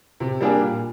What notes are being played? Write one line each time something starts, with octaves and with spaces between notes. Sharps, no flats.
C3
G3 A#3 D4 G#4
A#2